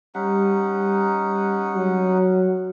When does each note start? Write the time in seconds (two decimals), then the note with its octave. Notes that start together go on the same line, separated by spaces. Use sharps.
0.15 G3 C#4 D#4 G4 F#5
1.74 F#3